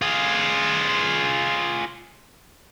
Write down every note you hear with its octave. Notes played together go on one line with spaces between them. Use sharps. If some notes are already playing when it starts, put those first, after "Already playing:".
F4 G#4